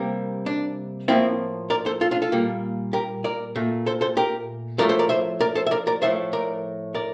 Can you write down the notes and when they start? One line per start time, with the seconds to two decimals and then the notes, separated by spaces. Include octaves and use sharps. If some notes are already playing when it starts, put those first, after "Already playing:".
Already playing: C3 G3 A#3
0.46 D4
1.08 A2 F3 A#3 C4 E4
1.70 A#4 D5
1.86 A4 C5
2.01 F4 A4
2.11 D4 F4
2.22 F4 A4
2.32 A#2 G3 A#3
2.93 G4 A#4
3.24 A#4 D5
3.56 A#2 A3
3.86 A4 C5
4.01 A4 C5
4.17 G4 A#4
4.78 A2 F3 A3 A#4 D5
4.89 A4 C5
4.99 A#4 D5
5.09 C5 E5
5.40 A#4 D5
5.55 A4 C5
5.67 E5
5.71 A#4 D5
5.87 A#4 D5
6.02 A2 F3 A3 C5 E5
6.33 A#4 D5
6.94 A#4 D5